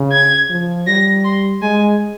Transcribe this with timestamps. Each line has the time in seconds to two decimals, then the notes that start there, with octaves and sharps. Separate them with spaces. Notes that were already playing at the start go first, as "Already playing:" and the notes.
Already playing: C#3
0.12 G#6
0.50 F3
0.87 G3 A#6
1.24 C6
1.62 G#3 G#5